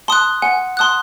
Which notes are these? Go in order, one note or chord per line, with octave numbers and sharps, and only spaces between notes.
A5 C6 D#6 F#6
F#5 G#5
A5 C6 D#6 F#6